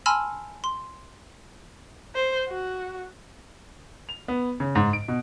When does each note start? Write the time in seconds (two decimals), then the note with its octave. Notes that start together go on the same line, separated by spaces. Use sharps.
0.06 G#5 A5 B5 C6 E6 F6
0.64 C6
2.15 C5
2.48 F#4
4.09 F7
4.28 B3
4.60 C#3
4.75 G#2
4.93 D7
5.08 B2